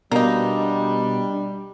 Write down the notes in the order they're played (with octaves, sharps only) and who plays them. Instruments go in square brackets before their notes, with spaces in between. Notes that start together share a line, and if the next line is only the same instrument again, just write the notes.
[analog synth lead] B2 [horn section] G3 [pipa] A#3 D#4 [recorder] D4